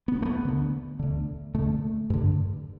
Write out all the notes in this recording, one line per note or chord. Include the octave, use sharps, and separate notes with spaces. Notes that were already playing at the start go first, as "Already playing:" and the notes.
B3
A3
B3
D2 D3
D2 D3
D2 D3 A3
G2 D3